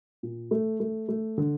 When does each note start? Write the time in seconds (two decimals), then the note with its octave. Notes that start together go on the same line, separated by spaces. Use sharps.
0.23 A#2
0.51 A3
0.80 A3
1.09 A3
1.38 D3